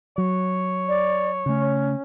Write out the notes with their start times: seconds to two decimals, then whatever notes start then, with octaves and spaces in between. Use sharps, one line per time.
0.18 F#3 C#5
0.88 D5
1.46 C#3 A3 C#4